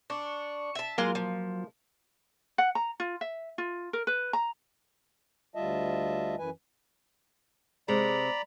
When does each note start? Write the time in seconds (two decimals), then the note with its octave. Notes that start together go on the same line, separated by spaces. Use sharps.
0.10 D4 C#6
0.75 E5 A5
0.98 F#3 G#3 A#3 F4 A#4
1.15 F3
2.58 F#5
2.75 A#5
3.00 F4
3.21 E5
3.58 F4
3.93 A#4
4.07 B4
4.33 A#5
5.55 D2 G3 F4 D#5 E5 A5
6.39 F#2 E3 B4 G#5
7.88 C3 G#3 D5 A#5 B5